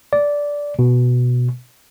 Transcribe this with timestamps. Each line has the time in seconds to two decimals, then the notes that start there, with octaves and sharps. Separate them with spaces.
0.13 D5
0.79 B2